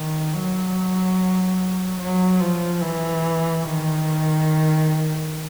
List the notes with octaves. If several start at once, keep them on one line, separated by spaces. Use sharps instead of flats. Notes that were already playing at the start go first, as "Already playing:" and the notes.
Already playing: D#3
F#3
F#3
F3
E3
D#3